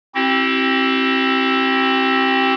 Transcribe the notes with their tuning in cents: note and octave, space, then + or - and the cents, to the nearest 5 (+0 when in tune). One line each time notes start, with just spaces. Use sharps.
C4 +20 E4 +0 G4 -40